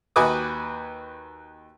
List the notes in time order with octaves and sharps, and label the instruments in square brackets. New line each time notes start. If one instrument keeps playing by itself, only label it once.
[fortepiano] D#2 F#4 B4 G#5 D6 D#6